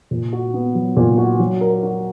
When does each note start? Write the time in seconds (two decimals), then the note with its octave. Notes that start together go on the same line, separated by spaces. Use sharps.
0.11 A#2
0.33 F#4
0.54 B3
0.75 F#3
0.97 A#2
1.18 F#4
1.40 F#3
1.61 A#4
1.83 F#4